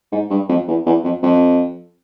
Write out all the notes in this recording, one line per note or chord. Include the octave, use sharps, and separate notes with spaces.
G#2
G2
F2
E2
E2
F2
F2